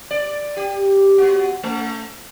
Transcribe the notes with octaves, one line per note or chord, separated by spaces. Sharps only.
D5
G4
B3 F#4
A3